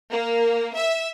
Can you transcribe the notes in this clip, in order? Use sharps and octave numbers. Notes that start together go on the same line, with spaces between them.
A#3
E5